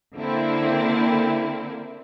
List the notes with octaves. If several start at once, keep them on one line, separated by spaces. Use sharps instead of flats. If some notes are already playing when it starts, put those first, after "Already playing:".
D3 A#3 C4 E4